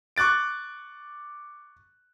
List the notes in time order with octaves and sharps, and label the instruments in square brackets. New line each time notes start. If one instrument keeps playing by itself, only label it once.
[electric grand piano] C#6 D6 F#6 A6 D7